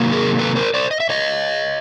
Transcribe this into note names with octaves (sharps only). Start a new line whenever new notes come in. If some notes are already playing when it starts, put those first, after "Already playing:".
Already playing: C3 D#3 F#3 A#3
G#4 A#4
A4 B4
A#4 C5
C5 D5
D#5
E5
C#5 D#5